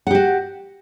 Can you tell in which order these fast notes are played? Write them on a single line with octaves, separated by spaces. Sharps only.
F#5 G4 F#4